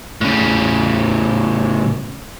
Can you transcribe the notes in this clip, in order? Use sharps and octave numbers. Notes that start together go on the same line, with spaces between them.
A2 C#3